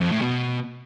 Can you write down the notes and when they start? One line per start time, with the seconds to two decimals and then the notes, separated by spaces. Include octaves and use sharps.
0.01 F2
0.11 A2
0.22 B2